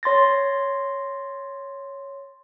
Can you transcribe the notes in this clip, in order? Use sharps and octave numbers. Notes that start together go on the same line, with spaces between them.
C#5 C6 A6 A#6